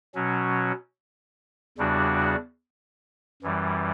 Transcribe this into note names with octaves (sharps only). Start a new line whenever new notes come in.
B2 F#3 C#4
E2 C#3 G3 D4 F#4
F#2 E3 G3